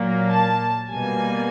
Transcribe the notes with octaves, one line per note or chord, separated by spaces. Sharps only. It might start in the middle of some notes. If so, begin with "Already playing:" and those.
Already playing: A#2 F#3 A#3
A5
B2 G3 A#3 G#5